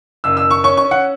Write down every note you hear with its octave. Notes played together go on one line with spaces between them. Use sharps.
F#1 E6
E6
F#1
C#6
C#4 C#6
C#6
C#4
F#5